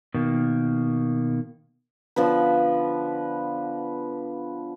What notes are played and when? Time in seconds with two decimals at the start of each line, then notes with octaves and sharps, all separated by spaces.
0.15 B2 D#3 A#3
2.16 D3 F3 B3 B4